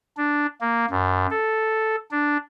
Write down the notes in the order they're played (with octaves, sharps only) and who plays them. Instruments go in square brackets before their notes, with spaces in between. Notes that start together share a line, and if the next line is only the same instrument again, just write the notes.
[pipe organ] D4
A#3
F#2
A4
D4